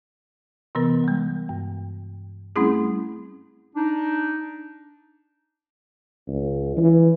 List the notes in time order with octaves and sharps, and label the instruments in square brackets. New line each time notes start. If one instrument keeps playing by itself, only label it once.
[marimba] C3 E3 B3 A#4
G3 G#3
G2
G3 A3 C4 C#4 E4 G#4
[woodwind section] D4 D#4
[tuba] C#2
E3